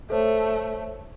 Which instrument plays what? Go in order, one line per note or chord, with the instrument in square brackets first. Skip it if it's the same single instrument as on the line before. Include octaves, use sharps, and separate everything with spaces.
[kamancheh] A3 [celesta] A4 C5 C#5